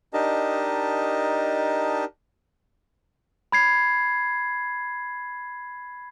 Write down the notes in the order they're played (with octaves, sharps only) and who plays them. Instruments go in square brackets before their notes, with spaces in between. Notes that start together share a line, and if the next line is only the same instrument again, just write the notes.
[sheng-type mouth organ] D4 D#4 G4 A#4 D#5 A5
[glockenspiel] B5 G#6 C7